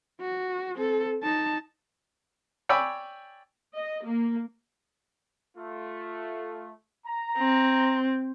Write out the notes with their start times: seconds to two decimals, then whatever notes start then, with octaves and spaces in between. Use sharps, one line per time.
0.21 F#4
0.75 C4 A4
1.23 D#4 A5
2.69 C#5 D5 G5 G#5 B5 E6
3.75 D#5
4.05 A#3
5.57 A3 F4
7.07 A#5
7.38 C4